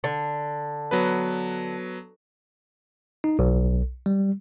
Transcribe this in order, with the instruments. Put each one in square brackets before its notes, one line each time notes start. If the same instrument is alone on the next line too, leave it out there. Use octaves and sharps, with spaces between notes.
[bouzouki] D3
[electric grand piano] F#3 B3 B4
[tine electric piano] D#4
B1
G3